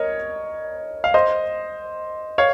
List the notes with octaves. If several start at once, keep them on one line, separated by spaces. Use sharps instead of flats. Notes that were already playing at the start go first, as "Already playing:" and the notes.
Already playing: A#4 C#5 D#5
F5
C5 D#5
C#5 F5